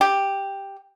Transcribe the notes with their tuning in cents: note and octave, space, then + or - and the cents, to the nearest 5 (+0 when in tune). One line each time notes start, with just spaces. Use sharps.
G4 +5